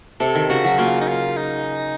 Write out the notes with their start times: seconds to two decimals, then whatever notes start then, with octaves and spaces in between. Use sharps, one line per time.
0.20 C3 A4
0.35 D#3
0.49 C#3 F#4
0.64 F#3
0.79 A#3 F4
1.01 D#4
1.08 F4
1.37 D#4